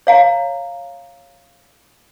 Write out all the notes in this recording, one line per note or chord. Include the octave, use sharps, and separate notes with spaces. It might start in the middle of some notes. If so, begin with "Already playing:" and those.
C#5 F5 A#5